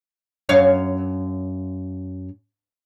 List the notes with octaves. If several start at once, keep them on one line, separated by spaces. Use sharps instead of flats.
F#2 C#5 F5